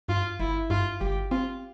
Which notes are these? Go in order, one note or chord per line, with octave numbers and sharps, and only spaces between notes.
G2 F4
G1 E4
G2 F4
G1 G4
C4 F4